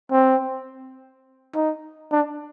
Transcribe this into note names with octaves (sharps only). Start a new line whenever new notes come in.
C4
D#4
D4